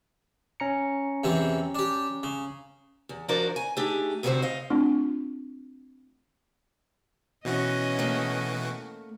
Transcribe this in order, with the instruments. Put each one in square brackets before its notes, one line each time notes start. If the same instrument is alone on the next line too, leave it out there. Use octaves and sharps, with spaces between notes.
[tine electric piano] C#4 A#5 C#7
[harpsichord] E2 C3 C4
D4 G4
C#3
[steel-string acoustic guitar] E2
F3 D4 F#4 A#4 C5 D5
G#5
A3 D4 D#4 G4 G#4
D2 C3 F3 A3 F#4 C5
D#5 F5
[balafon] A3 C4 D4 F4
[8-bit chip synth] B2 E3 F#4 [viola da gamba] C#4 D#5
[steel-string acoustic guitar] A3 A#3